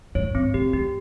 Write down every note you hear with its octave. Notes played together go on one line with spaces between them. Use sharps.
G2 C#5
G#2 C4
A#2 G4
G2 G4